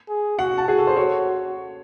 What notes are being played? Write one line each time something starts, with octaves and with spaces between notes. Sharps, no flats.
G#4
F#4 F#5
A5
F#4 G#4
A4
C5
F#4 C#5